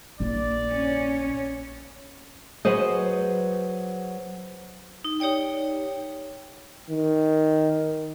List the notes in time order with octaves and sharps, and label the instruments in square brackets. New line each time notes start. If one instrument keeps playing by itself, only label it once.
[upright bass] A#1 E4 [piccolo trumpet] D5
[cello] C#4 C#5
[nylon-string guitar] F#3 G#4 B4 C5 D#5
[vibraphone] D#4
D#4 G4 C#5 D5 G5
[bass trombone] D#3